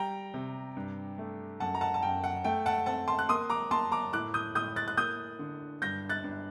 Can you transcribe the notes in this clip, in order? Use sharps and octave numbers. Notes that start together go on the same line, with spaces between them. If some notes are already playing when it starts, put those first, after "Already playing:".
Already playing: G3 G5 A#5
C3
G2
A3
F#2 F#5 A5
A#5
F#5 A5
A5
F#2 G5
F#5
A3 G5
F#5 A5
C4 F#5 A5
A5 C6
F#6
A#3 C6 D#6
A#5 D6
A#3 A5 C6
A#5 D6
A2 D6 F#6
D#6 G6
A2 D#6 G6
F#6 A6
F#6
A#3 D#6 G6
D3
G2 G6 A#6
F#6 A6
G2